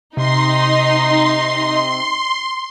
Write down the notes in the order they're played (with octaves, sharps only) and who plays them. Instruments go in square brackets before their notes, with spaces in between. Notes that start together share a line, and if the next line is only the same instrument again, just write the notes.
[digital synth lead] C3 [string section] D#4 [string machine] C6